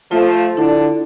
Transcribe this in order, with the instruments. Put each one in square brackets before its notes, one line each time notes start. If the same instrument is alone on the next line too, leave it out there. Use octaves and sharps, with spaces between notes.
[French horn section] F3 A3 [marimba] F4
[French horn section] D3 D4 [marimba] E4